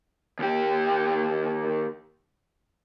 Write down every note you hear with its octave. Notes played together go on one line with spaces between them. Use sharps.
D#2 G4